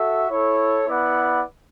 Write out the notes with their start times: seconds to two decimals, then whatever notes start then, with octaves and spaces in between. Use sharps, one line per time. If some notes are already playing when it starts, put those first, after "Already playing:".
Already playing: F#4 A4 E5
0.30 E4 A4 C#5
0.87 B3 E4 B4 D5 F#5